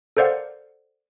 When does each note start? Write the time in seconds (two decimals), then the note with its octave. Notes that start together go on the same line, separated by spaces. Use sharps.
0.17 A4 A#4 C5 D5 F5 F#5